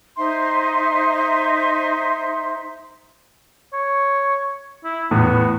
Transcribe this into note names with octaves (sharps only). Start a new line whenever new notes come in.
D#4 C5 E5 C6
C#5
E4
E2 A2 B3